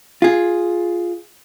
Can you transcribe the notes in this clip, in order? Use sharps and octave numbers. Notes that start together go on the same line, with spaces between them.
F4 G#4